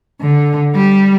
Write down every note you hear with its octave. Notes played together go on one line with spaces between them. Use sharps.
D3
G3